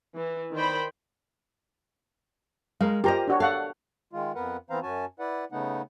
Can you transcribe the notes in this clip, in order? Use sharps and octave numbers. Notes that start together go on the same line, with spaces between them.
E3
D#3 C5 D5 G5 B5
G#3 A#4 F5
F4 G4 A#4 C5 D#5 A#5
D4 F#4 C#5
A4 F5 F#5
D#3 G#3 F4
F2 B3 A#4 B4 F#5
E3 B3 C4 C5 F5 A#5
F#2 C#4 F#4 G#5 A5
E4 B4 D5 F#5
C#3 A3 B3 D#4 F#5